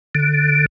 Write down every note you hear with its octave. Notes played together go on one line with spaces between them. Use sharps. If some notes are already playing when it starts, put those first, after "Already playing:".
D3